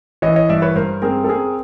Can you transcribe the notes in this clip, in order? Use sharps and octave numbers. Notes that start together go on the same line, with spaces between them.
E3 C#5 D#5
C#5 D#5
G2 D5 E5
B4 C#5
G2 A#4 C5
C4 G#4 A#4
A4
C4 G#4 A#4